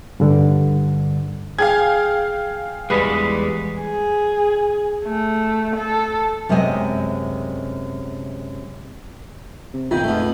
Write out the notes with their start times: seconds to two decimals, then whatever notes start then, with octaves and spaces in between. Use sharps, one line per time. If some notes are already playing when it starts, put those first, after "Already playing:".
0.20 G2 D3 G3
1.59 G#4 F5 G5 G#6
2.90 E2 G3 G#3 B4 D#6
3.82 G#4
5.05 A3
5.76 A4
6.49 F#2 C3 G#3 B3 D#5 G#5
9.74 C3
9.91 B1 F#2 A#2 D#3 F4 G5
10.04 F2 G#2 A3 B3